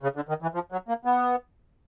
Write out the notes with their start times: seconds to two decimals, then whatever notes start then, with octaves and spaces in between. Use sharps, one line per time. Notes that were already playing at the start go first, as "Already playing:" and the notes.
0.03 C#3
0.16 D3
0.29 D#3
0.42 E3
0.54 F3
0.72 F#3
0.88 A#3
1.05 B3